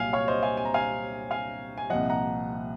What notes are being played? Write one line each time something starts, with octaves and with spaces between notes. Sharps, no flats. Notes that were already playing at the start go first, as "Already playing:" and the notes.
Already playing: C2 A#2 F#3 F5 G#5
C#5 F5
C5 D#5
F5 G#5
G#5
A#5
F5 G#5
F5 G#5
G#5
C2 A#2 F3 D#5 F#5
F#5 A#5